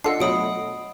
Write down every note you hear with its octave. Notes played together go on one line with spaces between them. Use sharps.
D4 F4 A4 D#5 F#5 C7
B2 F#3 A3 B5 D#6 D7